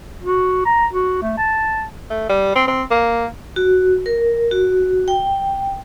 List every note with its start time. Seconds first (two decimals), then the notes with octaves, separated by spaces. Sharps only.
0.23 F#4
0.65 A#5
0.93 F#4
1.22 A3
1.38 A5
2.10 A3
2.30 G3
2.56 C4
2.68 C4
2.91 A#3
3.56 F#4
4.06 A#4
4.52 F#4
5.08 G5